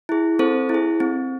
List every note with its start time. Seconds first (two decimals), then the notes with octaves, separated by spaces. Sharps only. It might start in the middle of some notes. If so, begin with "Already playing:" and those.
0.09 E4 G#4
0.39 C4 A4 C5
0.69 E4
0.74 G#4
1.00 C4